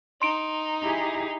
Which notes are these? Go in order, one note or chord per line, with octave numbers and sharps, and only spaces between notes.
D#4 C6 D7
E4 G4 G#4